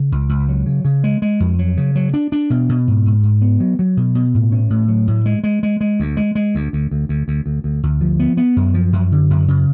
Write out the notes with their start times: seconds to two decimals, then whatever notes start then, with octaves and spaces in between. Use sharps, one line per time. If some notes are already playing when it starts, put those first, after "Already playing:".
Already playing: C#3
0.12 C#2
0.29 C#2
0.49 F#3
0.66 C#3
0.85 C#3
1.04 G#3
1.22 G#3
1.40 F2
1.59 F#3
1.77 C#3
1.95 F#3
2.14 D4
2.32 D4
2.50 B2
2.69 B2
2.87 G#2
3.06 G#2
3.23 G#2
3.41 B3
3.60 F#3
3.79 F#3
3.97 B2
4.15 B2
4.34 A2
4.52 C#4
4.70 A2
4.88 F#3
5.08 A2
5.26 G#3
5.44 G#3
5.63 G#3
5.81 G#3
6.00 D2
6.17 G#3
6.35 G#3
6.55 D2
6.73 D2
6.91 D2
7.09 D2
7.28 D2
7.46 D2
7.64 D2
7.83 D2
8.01 F3
8.20 B3
8.37 B3
8.56 F#2
8.74 F3
8.93 F#2
9.12 D3
9.30 F#2
9.48 C#3